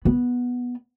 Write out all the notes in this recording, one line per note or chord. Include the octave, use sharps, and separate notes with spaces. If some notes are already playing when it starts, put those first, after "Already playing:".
B3